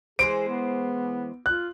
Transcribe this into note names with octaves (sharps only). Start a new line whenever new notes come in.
E3 G#3 G#4 C5 D7
B3
F4 F#6